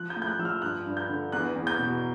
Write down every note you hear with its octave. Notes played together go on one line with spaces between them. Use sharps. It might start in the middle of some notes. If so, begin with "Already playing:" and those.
Already playing: F3 F#6
G6
A2
G6
F#6
F3 E6
F6
G2 F#6
G2
G6
D3
E2 F#6
E2
G6
B2